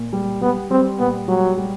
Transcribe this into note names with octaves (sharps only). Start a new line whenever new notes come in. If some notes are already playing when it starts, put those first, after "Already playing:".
Already playing: A#2
G3
G3 B3
G3 C4
A#2 B3
F#3 G3
G3